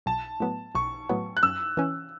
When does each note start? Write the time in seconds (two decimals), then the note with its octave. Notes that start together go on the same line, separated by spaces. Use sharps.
0.06 B1 A5
0.40 A2 F#3 B3
0.75 B1 C#6
1.09 A2 F#3 B3
1.37 F#6
1.43 F#2 E6
1.77 E3 C#4